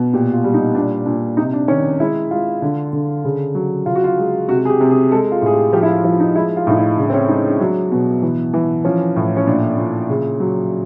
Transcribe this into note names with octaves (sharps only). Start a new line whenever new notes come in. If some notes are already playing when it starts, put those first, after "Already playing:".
Already playing: B2
A#2 G4
F4
G3
D#4
A#2 D4
A#2 D4
C3 D#4
D4
D#3 C#4
G#3 E4
G#3 F4
D3
D3
C#3
F#3
C#3 F4
F#4
F4
G#3
C3 F#4
G#4
G4
C3
G#4
G#3 A4
F4
A2 G#4
G4
F3 G4
E4
F4
F3 E4
D#4
G#3 E4
F4
A2 D#4
E4
C#3 D4
C4
C#4
G#3 D#4
D4
F#3
B2
E3
E3
F3 C#4
A2
C#4
A#2 D4
A#2
C#3
F#3